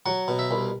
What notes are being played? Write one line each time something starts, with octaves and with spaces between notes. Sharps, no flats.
F#3 F#5
B2
E5
C2